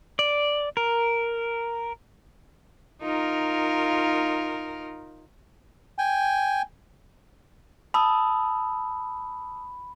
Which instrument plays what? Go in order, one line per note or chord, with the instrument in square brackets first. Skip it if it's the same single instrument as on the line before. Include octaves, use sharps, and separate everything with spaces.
[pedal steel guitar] D5
A#4
[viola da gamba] D#4 F4 A#4
[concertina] G5 G#5
[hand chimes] A5 D#6 E6 [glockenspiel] B5